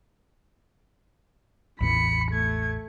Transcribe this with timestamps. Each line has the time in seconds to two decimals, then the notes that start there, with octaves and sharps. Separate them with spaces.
1.81 A1 E2 E3 B5 C#7
2.31 A3 G#6